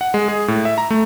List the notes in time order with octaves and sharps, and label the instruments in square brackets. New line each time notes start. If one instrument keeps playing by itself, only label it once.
[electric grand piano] F#5
G#3
G#4
A2
E5
A#5
A3